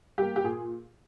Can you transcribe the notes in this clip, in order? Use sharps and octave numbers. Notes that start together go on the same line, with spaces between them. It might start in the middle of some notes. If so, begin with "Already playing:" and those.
G3 A#3 G4
G4
A#2 G#4